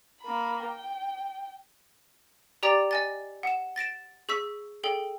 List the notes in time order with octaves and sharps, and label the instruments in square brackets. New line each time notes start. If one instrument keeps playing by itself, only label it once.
[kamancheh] A#3 B5
G5
[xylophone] G4 D5 G5 A#5 D6 A6
D#5 G#5 A6
F#5 E7
A6 A#6 D7 E7
G#4 C#6 E6 B6
G#4 A4 G5